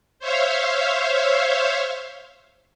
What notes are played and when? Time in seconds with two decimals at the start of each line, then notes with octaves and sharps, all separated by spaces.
0.19 C5 C#5 E5 F5